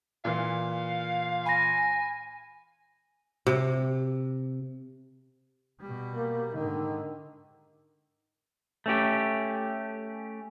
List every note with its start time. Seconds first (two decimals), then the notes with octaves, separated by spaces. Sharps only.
0.25 A#2 E3 F5
1.46 G#5 B5 A#6
3.47 C3
5.80 B2 G3
6.16 A#3
6.54 G#2 D3 D#3
8.86 A3 C#4 G4